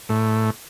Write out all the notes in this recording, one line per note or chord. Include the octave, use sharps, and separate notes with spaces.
A2